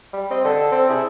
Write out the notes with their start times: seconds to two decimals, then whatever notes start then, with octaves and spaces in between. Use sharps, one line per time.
0.13 G3
0.30 C4 D#5
0.45 D3 A4
0.72 C4
0.89 C3 E4 G#4